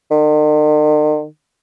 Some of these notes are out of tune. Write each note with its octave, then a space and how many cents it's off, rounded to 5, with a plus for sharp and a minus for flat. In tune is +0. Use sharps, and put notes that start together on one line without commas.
D#3 -45